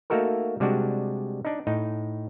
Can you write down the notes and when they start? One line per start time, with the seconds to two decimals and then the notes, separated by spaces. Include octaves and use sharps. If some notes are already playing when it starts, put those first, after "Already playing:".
0.10 A3 A#3 D#4 F#4 A4 A#4
0.60 C3 G3 G#3 D4 F#4
1.45 D4 D#4
1.67 A2 D#4